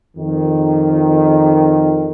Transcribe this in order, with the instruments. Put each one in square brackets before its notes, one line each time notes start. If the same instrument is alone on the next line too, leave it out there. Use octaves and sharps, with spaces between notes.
[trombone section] F2 D#3